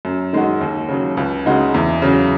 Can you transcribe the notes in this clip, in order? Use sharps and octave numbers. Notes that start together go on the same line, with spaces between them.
F#2
D#3 G#3 D#4 F#4
D#2
C#3 F#3
C#2
C#3 G#3 D#4 F#4
E2
C#3 F#3